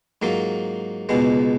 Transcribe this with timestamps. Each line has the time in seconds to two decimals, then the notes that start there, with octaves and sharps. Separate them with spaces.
0.22 G#2 F#3 A#3 F4
1.09 C#2 B2 G#3 B3